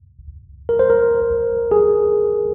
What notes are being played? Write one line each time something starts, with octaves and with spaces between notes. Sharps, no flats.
A#4
C5
A#4
G#4